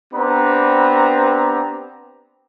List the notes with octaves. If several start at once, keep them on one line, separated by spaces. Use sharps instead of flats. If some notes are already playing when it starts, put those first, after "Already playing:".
B3 C4 D4 G4 B4 A#5